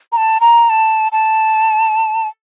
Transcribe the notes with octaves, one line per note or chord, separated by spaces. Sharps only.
A#5
A5
A#5
A5
A5